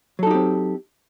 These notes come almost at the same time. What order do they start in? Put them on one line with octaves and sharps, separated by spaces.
F#3 A4 D#4 G4 C4